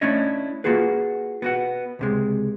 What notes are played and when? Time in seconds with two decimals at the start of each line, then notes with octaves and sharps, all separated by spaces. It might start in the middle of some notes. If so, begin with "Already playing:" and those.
0.01 A3 C#4 D4 E4 C#5 D#5
0.64 A#3 F4 F#4 G#4 B4
1.42 B3 F#4 F#5
1.99 C#2 C3 G#3